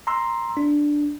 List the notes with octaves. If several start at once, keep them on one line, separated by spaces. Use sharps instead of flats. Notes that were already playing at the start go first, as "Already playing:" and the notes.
A#5 C6 E6
D4